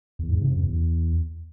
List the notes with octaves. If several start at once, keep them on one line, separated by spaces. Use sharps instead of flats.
E2
G#2
C3
F#2
E2